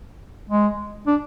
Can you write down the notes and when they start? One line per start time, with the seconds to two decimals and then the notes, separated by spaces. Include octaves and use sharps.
0.49 G#3
1.07 D4